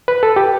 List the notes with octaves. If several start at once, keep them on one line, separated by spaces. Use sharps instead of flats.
B4
A4
G4